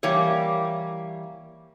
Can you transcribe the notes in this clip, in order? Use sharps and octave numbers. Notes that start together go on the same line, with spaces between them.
E3 G3 A#3 C#5